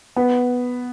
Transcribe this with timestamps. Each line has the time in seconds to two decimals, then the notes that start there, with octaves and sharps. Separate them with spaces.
0.16 B3